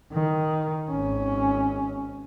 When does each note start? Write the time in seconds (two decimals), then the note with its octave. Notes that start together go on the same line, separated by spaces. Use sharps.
0.13 D#3
0.90 G#1 C#4